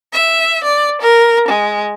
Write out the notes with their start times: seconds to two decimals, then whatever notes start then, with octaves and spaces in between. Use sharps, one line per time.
0.13 E5
0.62 D5
1.01 A#4
1.48 G#3